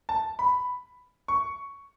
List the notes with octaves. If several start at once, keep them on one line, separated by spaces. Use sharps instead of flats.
A5
B5
C#6